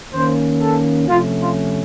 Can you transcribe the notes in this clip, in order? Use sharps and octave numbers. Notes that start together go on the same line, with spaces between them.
D#3 A#3 C#4 C5
A4
C3 F3 A3 C#4 F4
F4